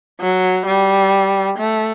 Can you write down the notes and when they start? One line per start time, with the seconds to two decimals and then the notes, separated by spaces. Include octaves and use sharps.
0.20 F#3
0.66 G3
1.58 A3